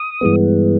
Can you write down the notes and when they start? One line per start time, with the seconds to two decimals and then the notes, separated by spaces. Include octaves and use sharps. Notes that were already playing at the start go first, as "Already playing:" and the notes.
Already playing: D#6
0.21 G2 E3 G#3 B3